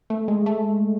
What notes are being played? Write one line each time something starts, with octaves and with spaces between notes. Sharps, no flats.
A3
G#3
A3